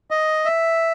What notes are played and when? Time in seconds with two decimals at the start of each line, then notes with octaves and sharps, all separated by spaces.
0.11 D#5
0.45 E5